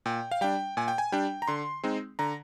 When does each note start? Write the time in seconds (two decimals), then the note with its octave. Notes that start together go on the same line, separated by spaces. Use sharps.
0.06 A#2 G5
0.32 F5
0.41 G3 D4 G5
0.77 A#2 G#5
0.88 G5
0.98 G#5
1.12 G3 D4 G5
1.42 A#5
1.48 D3 C6
1.83 G#3 C4 D#4
2.19 D3 A#5